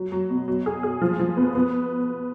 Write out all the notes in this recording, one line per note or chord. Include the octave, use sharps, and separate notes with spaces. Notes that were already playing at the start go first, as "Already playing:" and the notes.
Already playing: F#3
F#3
B2
F#3
G#4
G#4
F3
F3
B3
B3